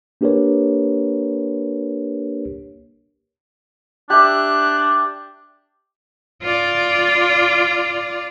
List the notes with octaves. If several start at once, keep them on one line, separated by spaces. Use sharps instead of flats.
A#3 D4 G4 A#4 B4 C#5
D4 G4 E5 F#6
F4 D5